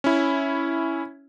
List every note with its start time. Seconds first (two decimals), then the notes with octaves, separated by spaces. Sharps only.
0.04 C#4 E4